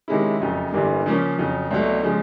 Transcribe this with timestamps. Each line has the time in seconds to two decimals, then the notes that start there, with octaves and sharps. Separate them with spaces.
0.08 C3 D#3 G#3 C#4 E4
0.40 F#1 F2 C#3 F#3
0.72 G1 G2 E3 G3 A#3
1.06 C#3 F3 A#3 C#4
1.38 F2 C#3 F#3
1.71 C2 B2 F#3 A3
2.03 C#3 F3 G#3